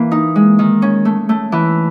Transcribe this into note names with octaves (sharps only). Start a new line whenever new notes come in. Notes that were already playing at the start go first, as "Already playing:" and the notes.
Already playing: E3 A#3
D#4
G#3
D#3
C#4
A3
A3
E3